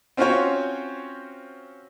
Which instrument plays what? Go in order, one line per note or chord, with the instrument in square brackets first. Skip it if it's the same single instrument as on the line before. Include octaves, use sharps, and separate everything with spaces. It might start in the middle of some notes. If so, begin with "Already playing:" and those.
[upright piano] C4 C#4 F4 F#4 C5 C#5